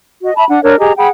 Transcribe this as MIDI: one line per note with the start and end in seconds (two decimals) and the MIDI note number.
0.23 0.32 66
0.23 0.32 75
0.36 0.45 76
0.36 0.45 81
0.36 0.45 83
0.49 0.61 62
0.49 0.61 78
0.63 0.78 62
0.63 0.78 70
0.63 0.78 73
0.80 0.93 67
0.80 0.93 68
0.80 0.93 75
0.80 0.93 82
0.97 1.08 68
0.97 1.08 78
0.97 1.08 79
0.97 1.08 83